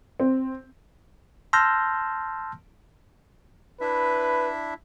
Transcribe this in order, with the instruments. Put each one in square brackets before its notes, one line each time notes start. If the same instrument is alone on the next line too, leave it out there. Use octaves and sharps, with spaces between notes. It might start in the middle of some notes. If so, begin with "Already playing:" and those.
[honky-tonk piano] C4
[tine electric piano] A5 C6 E6 F6 G6 A#6
[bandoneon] D4 E4 E5 [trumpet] B4